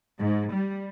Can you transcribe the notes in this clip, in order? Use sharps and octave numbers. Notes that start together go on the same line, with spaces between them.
G#2
G3